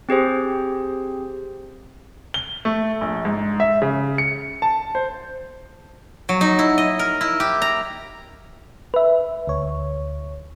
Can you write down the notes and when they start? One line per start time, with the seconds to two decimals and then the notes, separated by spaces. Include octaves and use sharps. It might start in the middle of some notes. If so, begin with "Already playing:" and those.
0.09 C4 G4 G#4 C5
2.34 G7
2.65 A3
3.01 A#1
3.25 G#2
3.60 E5
3.82 C#3
4.18 C#7
4.62 A5
4.95 C5
6.29 F#3
6.41 D#4
6.59 E4
6.78 D#5
6.99 A#4
7.21 E4
7.40 G4
7.62 A#5
8.94 B4 E5
9.47 D2 C#5